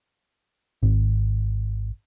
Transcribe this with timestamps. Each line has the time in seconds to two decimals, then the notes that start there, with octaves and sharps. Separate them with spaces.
0.83 G#1